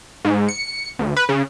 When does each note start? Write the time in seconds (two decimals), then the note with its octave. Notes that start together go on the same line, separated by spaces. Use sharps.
0.25 G#2
0.48 C#7
0.99 D2
1.16 B4
1.29 C#3